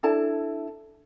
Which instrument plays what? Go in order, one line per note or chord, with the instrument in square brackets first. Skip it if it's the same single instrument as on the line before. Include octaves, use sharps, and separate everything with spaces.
[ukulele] D4 E4 A4 A5